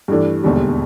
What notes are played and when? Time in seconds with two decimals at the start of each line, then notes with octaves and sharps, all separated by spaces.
0.08 G2 E3 A3 D4
0.44 E1 D#2 D3 G3